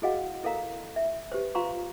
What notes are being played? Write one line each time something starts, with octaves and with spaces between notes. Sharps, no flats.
E4 F#4 G#4 D#5 F5 F#5
E4 A4 A#4 F5 A#5
E5
G4 B4 C5
F4 F5 A#5 C6 C#6